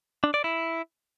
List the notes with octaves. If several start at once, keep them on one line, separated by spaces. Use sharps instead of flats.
D4
D5
E4